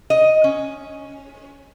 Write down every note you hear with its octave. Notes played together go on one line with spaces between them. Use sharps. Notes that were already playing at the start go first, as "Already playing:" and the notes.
D#5
C#4